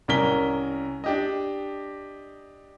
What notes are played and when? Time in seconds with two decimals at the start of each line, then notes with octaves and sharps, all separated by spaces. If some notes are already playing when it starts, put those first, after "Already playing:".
0.08 C2 C#4 A#4 B6 G7
1.04 D4 G4 D#5